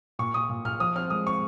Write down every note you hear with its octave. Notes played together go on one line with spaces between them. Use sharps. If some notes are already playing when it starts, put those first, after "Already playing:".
A#2 C#6
A#2 D#6
A#2
A#2 F6
F3 D#6
C4 F6
G#3 D#6
C4 C#6